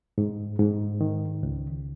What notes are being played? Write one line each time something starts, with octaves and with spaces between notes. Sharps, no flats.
G#2
G#2
D#3
C#2